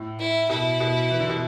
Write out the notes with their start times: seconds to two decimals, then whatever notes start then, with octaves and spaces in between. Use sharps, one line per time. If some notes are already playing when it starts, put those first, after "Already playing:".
Already playing: A2
0.20 E4
0.49 B2 E4
0.80 B2
1.10 E3
1.20 D3
1.30 B2